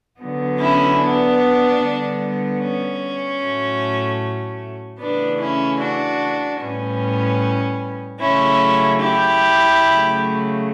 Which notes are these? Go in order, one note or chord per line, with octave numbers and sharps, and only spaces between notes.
D3 F#3 B3
C#4 E4
B3 D4
D3 G3 B3
C#4
A2 F#3 A3
C#3 E3 A3 B3 D4
C#4 E4
D4 F#4
A2 G3 B3 C#4
C#3 F#3 A3 C#4 E4
E4 G4
C#3 F#3 A3